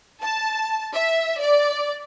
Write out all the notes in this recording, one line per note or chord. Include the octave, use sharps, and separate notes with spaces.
A5
E5
D5